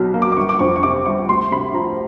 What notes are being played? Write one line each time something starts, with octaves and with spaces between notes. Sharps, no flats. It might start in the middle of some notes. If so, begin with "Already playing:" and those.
Already playing: B1 B2 F#3
A#3
D6
D6
G1 C#6
D6
F2 C#6
C#6
C3 D6
G1 C#6
D2 C6
C3 B5
F3 A#5